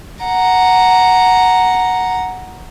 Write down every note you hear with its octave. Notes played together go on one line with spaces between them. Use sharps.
F#5 A#5